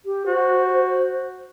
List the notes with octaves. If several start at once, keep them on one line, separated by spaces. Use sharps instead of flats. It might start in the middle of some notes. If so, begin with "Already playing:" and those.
G4
F#4 C5